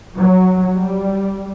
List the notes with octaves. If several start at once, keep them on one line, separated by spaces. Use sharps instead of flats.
F#3
G3